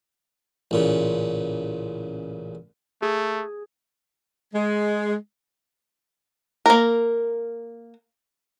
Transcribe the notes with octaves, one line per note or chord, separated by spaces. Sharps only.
A1 A#2 C#3
A3 G#4
G#3
A#3 A#4